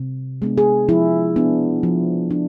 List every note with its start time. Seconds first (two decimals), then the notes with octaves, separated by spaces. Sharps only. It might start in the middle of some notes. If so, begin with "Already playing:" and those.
Already playing: C3
0.42 G#3 B3 D4
0.58 G#4
0.89 F3 E4
1.36 B3 D4
1.83 F3
2.31 D4